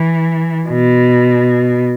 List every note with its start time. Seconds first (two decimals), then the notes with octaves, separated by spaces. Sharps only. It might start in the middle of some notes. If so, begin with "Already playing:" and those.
Already playing: E3
0.68 B2